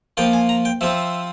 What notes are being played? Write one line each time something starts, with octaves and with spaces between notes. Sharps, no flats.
F3 A#3 F4 G5
G#5
A#5
G5
F3 C4 F4 E5